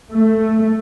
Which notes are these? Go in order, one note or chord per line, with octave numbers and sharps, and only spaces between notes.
A3